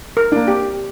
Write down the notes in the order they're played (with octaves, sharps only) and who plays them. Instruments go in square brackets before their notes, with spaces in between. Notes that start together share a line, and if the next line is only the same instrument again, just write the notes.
[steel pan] A#4
[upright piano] A#3 D4
[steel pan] G4